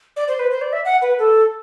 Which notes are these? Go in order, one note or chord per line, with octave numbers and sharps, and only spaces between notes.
D5
C5
B4
C5
D5
E5
F#5
B4
A4